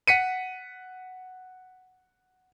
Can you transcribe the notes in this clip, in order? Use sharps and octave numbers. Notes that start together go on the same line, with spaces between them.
F#5 B6 C#7 D#7